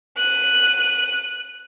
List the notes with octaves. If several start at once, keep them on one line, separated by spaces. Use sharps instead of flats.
F#6 D#7